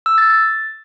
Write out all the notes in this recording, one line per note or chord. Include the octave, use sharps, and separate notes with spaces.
E6
A6
A6